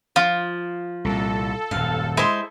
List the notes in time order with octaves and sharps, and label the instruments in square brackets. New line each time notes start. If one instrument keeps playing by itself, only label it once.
[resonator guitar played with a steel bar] F3 [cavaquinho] F4
[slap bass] C2 A#2 [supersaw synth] A4
[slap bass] D#1 F#2 [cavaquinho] F5
[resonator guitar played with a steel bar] G#3 C5 [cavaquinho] E4